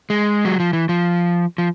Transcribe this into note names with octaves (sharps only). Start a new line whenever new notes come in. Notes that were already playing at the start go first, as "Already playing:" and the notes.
G#3
F#3
F3
E3
F3
F3